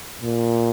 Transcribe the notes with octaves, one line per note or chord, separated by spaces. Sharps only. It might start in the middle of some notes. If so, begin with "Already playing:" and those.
A#2